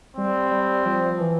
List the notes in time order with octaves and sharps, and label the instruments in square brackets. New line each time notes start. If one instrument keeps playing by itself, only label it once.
[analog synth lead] G3 [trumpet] C4
[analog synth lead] G3
F3
F3
E3